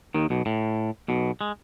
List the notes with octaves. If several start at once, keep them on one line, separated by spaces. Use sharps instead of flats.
D#2 D#3
B1 B2
A2
B1 B2
G#3